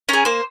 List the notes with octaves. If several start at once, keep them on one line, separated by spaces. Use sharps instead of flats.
C#4 G#4 A#4
A#3 C5